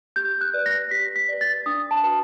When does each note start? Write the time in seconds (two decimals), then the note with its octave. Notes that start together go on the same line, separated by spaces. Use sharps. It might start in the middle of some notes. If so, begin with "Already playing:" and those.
0.16 G4 G6
0.41 F#6
0.54 B4 D5
0.66 A#6
0.91 G4 B6
1.16 B6
1.28 B4 D5
1.41 A6
1.66 D4 D#6
1.91 A5
2.03 F#4 B4